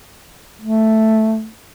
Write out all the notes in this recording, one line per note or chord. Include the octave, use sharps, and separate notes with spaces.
A3